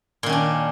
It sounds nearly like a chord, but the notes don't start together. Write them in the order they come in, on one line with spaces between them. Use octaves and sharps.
A#2 D#3 C#4 D4